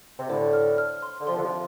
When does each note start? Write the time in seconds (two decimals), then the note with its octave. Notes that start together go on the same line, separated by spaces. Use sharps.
0.19 C3
0.29 A2 D3 C5
0.53 F6
0.78 F6
1.02 C6
1.20 D3
1.27 C3 F3 C6
1.37 D3
1.43 C3 F3